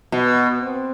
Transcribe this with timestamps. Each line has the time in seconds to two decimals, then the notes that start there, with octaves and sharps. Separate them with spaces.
0.12 B2 B3
0.61 C4